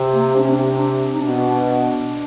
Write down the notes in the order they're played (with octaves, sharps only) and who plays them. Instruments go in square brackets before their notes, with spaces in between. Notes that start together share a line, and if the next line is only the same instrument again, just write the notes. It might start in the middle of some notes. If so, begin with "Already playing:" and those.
Already playing: [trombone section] C3
[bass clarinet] A#3
[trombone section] C3 [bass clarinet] D4
[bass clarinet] C#4
D4
D4
D#4
[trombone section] B2 [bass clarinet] D4